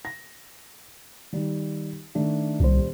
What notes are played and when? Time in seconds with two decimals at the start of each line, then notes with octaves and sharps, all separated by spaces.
0.05 A#6
1.33 D#3 G3 D#4
2.15 D#3 A3 D4
2.60 D#1 C2 G3 C5